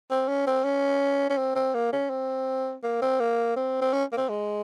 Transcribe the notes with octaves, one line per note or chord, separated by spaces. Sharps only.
C4
C#4
C4
C#4
C#4
C4
C4
A#3
C#4
C4
A#3
C4
A#3
C4
C4
C#4
A#3
C4
G#3